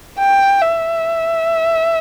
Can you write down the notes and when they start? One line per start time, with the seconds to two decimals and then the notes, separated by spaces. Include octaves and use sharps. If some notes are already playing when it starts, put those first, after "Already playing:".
0.19 G5
0.62 E5